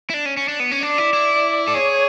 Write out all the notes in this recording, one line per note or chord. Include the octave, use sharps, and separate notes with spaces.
E4
D4
C#4
C#4
D4
B3
C#4
D4 D5
E4
E4
A4
G#4 C#5